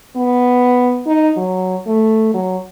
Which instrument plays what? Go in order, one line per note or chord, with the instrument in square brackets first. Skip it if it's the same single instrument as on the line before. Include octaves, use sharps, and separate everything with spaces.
[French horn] B3
D#4
F#3
A3
F#3